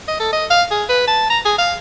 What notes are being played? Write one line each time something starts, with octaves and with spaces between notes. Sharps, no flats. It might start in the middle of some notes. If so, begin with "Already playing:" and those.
D#5
A4
D#5
F5
G#4
B4
A5
A#5
G#4
F5